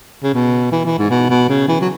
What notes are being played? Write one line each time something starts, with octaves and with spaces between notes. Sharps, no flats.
C#3
B2
E3
E3
G#2
B2
B2
C#3
E3
F#3